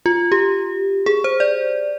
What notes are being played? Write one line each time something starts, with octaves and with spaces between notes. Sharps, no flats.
F4
G4
G#4
C5
D5